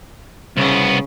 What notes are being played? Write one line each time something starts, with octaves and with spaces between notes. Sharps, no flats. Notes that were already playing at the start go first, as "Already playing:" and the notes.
C2 C#3 B3